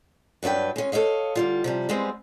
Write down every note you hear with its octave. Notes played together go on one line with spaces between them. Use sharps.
G2 F#3 D4 B4 G5
G#3 C#4
A4 A#4 C#5 D#5 F5
D3 G3 F4
C3 F3 G3
G3 G#3 B3 C4